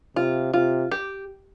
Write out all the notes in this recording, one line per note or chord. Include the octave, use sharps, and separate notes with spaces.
C3 F4
C3 F4
G4